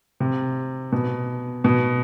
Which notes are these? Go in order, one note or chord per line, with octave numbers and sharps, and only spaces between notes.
C3
B2
B2